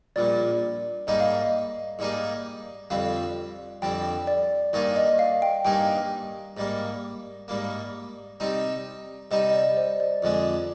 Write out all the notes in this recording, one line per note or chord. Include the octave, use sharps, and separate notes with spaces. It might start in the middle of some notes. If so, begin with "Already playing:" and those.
A#1 A#2 G3 D5
G#2 G3 A#3 D#4 G#4 D#5
F5
D#5
G#2 G3 A#3 D#4 G#4
F2 D3 G3 C4 F5
F2 D3 G3 C4 G5
D5
G2 D#3 A#3 D#4 G#4 D5
D#5
F5
G5
G2 D#3 A#3 D#4 G#4 G5
G#2 G3 A#3
G#2 G3 A#3
C3 G3 C4 D#4
C3 G3 C4 D#4 D#5
D#5
D5
C5
D5
F2 D3 G#3 D4